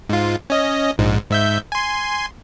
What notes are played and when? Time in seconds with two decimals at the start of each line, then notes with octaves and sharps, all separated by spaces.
0.10 G#2 F4
0.50 C#4 D#5
0.98 A#1 G#2
1.30 G#2 E5 G6
1.72 G#5 C6